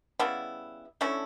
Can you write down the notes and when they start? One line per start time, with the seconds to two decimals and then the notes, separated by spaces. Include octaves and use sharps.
0.19 C#3 G3 B3 E4
1.01 D3 A3 C#4 E4